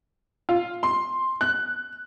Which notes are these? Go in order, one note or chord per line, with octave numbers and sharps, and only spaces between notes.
F4
C6
F#6